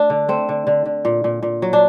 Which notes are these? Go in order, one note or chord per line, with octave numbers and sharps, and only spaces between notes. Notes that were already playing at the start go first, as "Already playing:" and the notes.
Already playing: A3 D4
D3
A3 C4
D3
D3
D3
A#2
A#2
A#2
F#3
D4